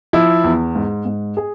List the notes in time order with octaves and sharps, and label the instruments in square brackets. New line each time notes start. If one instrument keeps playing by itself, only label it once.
[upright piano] F3 E4
E2
G#2
G#2
G#4